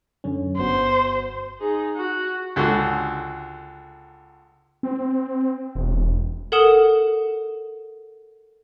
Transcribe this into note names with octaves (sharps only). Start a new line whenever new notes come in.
F#2 D3 C#4
G1 B3 F#4 C5
D#4 G#4
F#4
C#2 D3 F#4
C4
E1
A4 A#4 F#5 D#6 E7